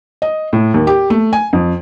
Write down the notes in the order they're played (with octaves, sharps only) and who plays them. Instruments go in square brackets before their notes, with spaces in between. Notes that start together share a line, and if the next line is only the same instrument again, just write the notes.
[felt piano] D#5
A2
D#2
G4
A3
G#5
F2